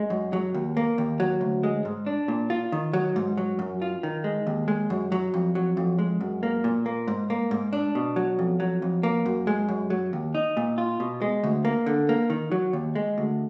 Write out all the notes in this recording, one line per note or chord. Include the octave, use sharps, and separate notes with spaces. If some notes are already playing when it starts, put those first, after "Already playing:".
Already playing: G#3
F#2
F#3
D#2
A#3
D#2
F#3
D2
G#3
G#2
D4
A#2
F4
D#3
F#3
G#2
F#3
F#2
F4
D#3
G#3
D#2
G#3
F#2
F#3
F2
F#3
F2
G#3
F#2
A#3
A#2
A#3
G#2
A#3
G#2
D4
B2
F#3
F2
F#3
F2
A#3
F#2
G#3
F#2
F#3
D#2
D#4
A#2
F4
B2
G#3
D2
A#3
D3
A#3
D#3
F#3
D#2
G#3
D2